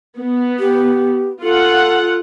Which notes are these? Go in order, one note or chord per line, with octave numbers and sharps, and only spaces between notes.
B3
G4
F4 A4 F#5